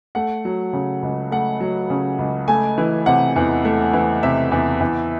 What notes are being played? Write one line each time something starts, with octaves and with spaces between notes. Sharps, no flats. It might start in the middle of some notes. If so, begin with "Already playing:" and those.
A3 F#5
F#3
C#3
C#2
A3 F#5
F#3
C#3
C#2
A3 G#5
E3
C3 F#5
E2
A3
E3
C3 E5
E2
E2